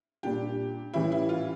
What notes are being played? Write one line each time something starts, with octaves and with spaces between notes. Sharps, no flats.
A#2 G3 D4 G4
A2 E3 G3 C#4 E4
E4
F4